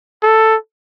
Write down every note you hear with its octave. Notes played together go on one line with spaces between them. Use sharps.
A4